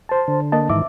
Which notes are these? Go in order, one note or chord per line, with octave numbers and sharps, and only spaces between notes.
C5 A5
D3
A#3 D#5 A5
G#2 D#3 E3 E5 D6